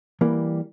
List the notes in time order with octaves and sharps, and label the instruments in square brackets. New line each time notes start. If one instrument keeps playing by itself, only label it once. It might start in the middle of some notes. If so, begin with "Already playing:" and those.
[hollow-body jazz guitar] E3 G3 A#3